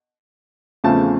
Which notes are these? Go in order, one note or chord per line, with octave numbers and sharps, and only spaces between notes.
E2 C#3 F3 A3 C4 A5